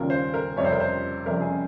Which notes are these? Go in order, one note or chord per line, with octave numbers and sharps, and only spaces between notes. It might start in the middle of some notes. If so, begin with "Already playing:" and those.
Already playing: D#2 C#3 G3 C#4 F4 A#4
C5
A#4
F1 F2 C3 G3 C#5
C5
A#4
C5
F1 F2 C3 G3 A#4
G#4